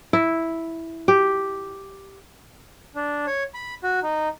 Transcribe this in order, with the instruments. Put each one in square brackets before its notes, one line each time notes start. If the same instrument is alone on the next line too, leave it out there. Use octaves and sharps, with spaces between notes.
[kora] E4
G4
[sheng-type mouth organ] D4
C#5
B5
F#4
D#4